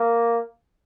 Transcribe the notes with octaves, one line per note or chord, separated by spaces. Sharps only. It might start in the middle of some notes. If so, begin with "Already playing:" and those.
Already playing: A#3